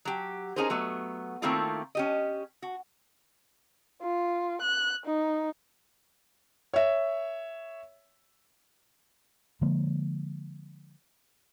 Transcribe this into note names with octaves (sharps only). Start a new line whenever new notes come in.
F#3 G4
C#4 D#4 F#4 G#4 A#4 C5
F#3 A3 B3
D#3 A3 A#3 C4 E4 F4
C#4 G4 D#5
F#4
F4
F#6
D#4
C#5 E5
D3 F3 G#3 A#3